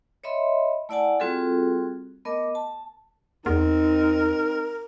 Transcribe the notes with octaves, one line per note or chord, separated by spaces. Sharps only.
C#5 D#5 E5 B5 C6
A3 E4 D5 F#5 G#5 A5
G3 C4 F4 F#4 G#4 A4
A3 B3 A#4 D#5 D6
A5
E2 C4 D#4 A#4